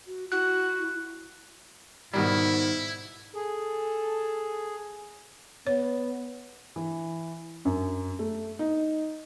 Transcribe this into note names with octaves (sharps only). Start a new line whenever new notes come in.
F#4
E4 F#4 F#6
G#2 B2 D#3 G3 E4
G#4 A4
B3 C#5
E3
F#2
A3
D#4